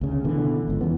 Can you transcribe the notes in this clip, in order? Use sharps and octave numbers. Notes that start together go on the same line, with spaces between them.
D2 C#3
B2 D3 E3
G1 C#2
E2 E3 B3